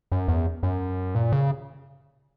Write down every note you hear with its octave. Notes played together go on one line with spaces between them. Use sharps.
F#2
E2
F#2
A#2
C#3